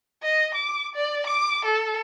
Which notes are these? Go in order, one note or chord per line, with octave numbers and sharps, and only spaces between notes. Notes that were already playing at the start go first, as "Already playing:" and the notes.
D#5
D6
D5
D6
A4